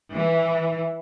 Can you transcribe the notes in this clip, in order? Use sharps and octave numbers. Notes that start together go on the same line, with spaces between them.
E3